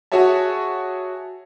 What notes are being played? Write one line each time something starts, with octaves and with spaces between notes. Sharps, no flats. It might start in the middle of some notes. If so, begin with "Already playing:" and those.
F#4 G#4 C#5 E5 A5